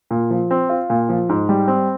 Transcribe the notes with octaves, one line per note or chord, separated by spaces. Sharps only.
A#2
F3
C4
F4
A#2
F3
G#2
G3
C4